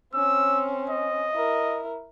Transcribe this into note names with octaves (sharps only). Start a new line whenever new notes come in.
C4 C#4 E6
D#5
E4 A#4